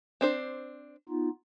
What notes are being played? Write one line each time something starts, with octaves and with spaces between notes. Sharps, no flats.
C4 D4 C5
B3 D#4 F4